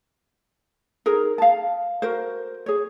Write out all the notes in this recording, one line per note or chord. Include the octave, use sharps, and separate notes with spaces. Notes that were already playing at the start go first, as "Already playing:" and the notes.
D#4 G#4 A#4
F5 A5
F#4 A#4 C5
G#4 C#5